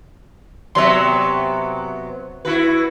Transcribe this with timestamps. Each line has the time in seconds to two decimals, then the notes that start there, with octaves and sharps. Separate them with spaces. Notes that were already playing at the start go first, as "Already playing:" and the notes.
0.75 C3 F#3 B3 E5 C6
2.45 E4 F#4 B4